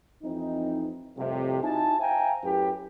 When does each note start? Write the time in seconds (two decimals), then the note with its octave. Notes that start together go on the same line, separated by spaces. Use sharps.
0.23 F2 E3 C4 D#4
1.17 C2 F2 A2 C3
1.63 D#4 E4 F#4 G#5 A5
2.00 C5 E5 F5 G5 G#5 A#5
2.43 F#2 A2 E4 G4 B4 G5